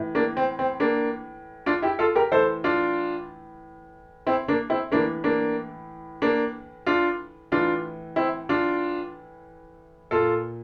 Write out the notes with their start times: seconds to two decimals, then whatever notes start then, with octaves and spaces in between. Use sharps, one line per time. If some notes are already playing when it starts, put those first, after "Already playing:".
Already playing: A2 E3
0.15 A#3 D4
0.37 C4
0.59 C4
0.80 A#3 D4
1.66 D4 F4
1.82 E4 G4
1.99 F4 A4
2.15 G4 A#4
2.31 A2 E3 A4 C5
2.64 D4 F4
4.26 C4 E4
4.48 A#3 D4
4.70 C4 E4
4.92 A2 E3 A#3 D4
5.24 A#3 D4
6.22 A#3 D4
6.87 D4 F4
7.52 A2 E3 D4 F4
8.16 C4 E4
8.49 D4 F4
10.11 A#2 F4 A4